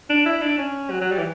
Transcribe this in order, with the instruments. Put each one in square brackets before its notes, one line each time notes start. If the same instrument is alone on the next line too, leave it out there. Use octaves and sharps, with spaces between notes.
[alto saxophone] D4
E4
D4
C#4
F#3
F#3
G3
E3